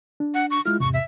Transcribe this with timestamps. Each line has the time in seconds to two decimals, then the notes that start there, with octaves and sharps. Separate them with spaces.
0.20 D4
0.34 F#5
0.51 C#6
0.66 G#3 E4 F4 F6
0.80 E2 G#2 C3 C#6
0.94 E5